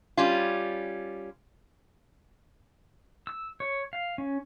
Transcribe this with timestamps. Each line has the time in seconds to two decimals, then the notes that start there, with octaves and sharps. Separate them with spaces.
0.17 G3 C#4 F4
3.27 E6
3.60 C#5
3.93 F5
4.18 C#4